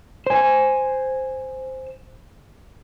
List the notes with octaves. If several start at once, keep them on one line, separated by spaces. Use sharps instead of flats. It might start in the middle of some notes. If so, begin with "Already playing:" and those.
C5 G#5